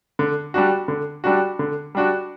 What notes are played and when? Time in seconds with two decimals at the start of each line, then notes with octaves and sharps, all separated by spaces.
0.19 D3
0.54 G3 D4 F#4
0.88 D3
1.24 G3 D4 F#4
1.59 D3
1.95 G3 D4 F#4